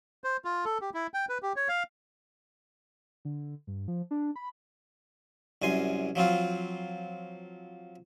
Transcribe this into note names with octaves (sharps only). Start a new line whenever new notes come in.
C5
F4
A4
G4
E4
G5
B4
G4
C#5
F5
D3
G2
F3
D4
B5
C2 F#2 G#5 C6
F3 F#3 C4 F4